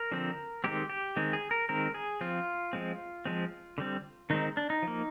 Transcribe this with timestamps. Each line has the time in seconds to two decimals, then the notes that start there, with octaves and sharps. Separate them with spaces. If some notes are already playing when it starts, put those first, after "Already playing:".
Already playing: A#4
0.12 D3 F3 C4
0.64 D#3 G#3 C4 G4
0.90 G4
1.16 D#3 G#3 C4
1.33 G#4
1.51 A#4
1.69 D#3 G#3 C4 A#4
1.94 G#4
2.21 F3 C4 F4
2.73 F3 G#3 C4
3.25 F3 G#3 C4
3.78 D3 G3 C4
4.30 D#3 G#3 C4 D#4
4.57 D4
4.70 D#4
4.82 F3 A#3